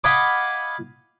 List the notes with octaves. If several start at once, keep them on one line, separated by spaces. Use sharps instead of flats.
D#5 F5 F#5 G#5 B5 D6